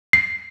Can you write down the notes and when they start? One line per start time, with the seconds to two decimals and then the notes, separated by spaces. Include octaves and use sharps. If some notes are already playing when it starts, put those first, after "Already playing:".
0.13 C7